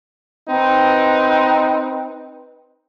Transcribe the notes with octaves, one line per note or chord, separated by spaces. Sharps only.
C4 D#4 B4